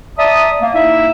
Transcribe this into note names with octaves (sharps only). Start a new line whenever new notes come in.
D5 E5 A5 A#5 D#6
A#3
A#3 D#4 E4 E5